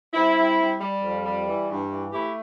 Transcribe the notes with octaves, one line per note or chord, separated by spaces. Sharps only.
G3 C4 E4
G3
G3
G3
F2
G3
E3
G2
E3
A3 E4 G4